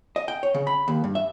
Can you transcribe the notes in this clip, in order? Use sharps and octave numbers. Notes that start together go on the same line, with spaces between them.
D#5
G5
C#5
C#3
B5
D#2
G2
E5